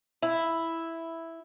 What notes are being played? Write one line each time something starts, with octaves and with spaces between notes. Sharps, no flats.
E4